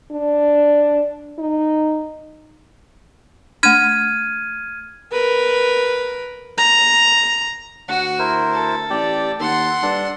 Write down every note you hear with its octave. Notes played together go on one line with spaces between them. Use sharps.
D4
D#4
A3 D4 F6 G#6 D#7
A#4 B4
A#5
D2 F#4 F#5
E4 A#4 C5
A4
A1 G4 D5 G5
D#2 A4 F#5 C6
G2 D4 A4